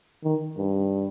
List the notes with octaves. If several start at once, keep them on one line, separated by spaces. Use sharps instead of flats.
D#3
G2